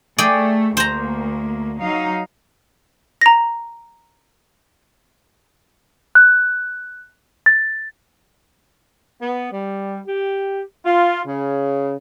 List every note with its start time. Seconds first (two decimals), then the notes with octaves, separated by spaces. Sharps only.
0.18 A3 G#4 D5 G5
0.77 D2 A#3 C5 A#5
1.80 F#3 D#4 F5
3.21 A#5 A#6
6.15 F#6
7.46 A6
9.21 B3
9.51 G3
10.06 G4
10.85 F4
11.26 C#3